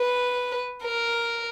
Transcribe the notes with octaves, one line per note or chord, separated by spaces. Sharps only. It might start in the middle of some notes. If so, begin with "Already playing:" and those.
Already playing: B4
A#4